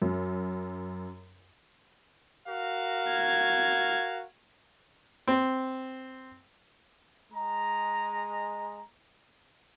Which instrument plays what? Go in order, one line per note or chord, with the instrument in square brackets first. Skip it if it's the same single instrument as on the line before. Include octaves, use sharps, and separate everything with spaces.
[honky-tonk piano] F#2
[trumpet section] F#4 A#4 F5
[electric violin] G#6
[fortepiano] C4
[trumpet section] G#3 A#5